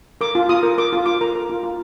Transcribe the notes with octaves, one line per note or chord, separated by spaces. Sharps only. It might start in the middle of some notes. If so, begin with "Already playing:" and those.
A#4 D6
F4
F4 D#6
A#4
A#4 D6
F4
F4 D6
A#4 A#5
A#4
F4
F4